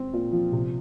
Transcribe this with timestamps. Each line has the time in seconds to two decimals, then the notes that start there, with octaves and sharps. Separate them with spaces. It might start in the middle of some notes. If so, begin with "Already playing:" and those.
Already playing: C4
0.13 A#2
0.32 F3
0.52 C3